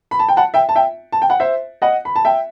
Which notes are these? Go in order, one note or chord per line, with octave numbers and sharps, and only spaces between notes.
B5
A5
G5
F#5 A5
E5 G5
A5
E5 G5
A5
G5
F#5
C5 E5
D#5 F#5
B5
A5
E5 G5